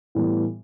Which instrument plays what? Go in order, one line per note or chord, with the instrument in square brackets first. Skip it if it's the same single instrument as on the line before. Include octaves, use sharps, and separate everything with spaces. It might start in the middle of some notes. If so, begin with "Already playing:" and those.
[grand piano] A2 E3 G3 B3